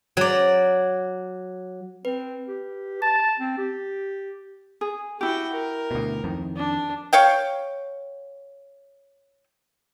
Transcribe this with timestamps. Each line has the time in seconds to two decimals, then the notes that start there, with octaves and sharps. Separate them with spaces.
0.17 F#3 D5
2.05 C4 B4
2.48 G4
3.02 A5 A6
3.40 C4
3.58 G4
4.81 G#4
5.21 E4 F#4 G4 G5
5.53 A#4
5.91 D2 B2
6.24 F2 D#3
6.56 D4
7.13 C#5 F5 G5